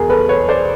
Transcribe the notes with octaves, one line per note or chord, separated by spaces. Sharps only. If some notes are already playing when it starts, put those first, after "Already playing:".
Already playing: E2 B2 G#4 A#4
A4 B4
B4 C#5
C5 D5